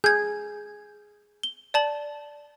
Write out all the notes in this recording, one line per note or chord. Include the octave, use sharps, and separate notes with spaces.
G#4 G6 G#6
G7
D5 A5 F#7